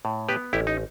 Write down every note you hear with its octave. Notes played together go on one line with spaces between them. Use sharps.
A2
B3 G4 B4
A1 E4 G4
D#4